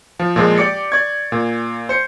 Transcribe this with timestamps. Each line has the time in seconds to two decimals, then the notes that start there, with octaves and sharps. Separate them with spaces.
0.20 F3
0.36 A#2 F3 G#3
0.58 G4 D5 D6 C#7
0.92 D5 C#6 G#6
1.32 A#2
1.89 C5 C#7